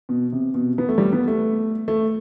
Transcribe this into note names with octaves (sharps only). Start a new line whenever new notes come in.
B2
C3
B2
B3
A3
G3
B3
A3
A3